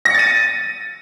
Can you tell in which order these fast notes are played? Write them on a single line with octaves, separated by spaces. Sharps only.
A#6 C#7 A6 D#7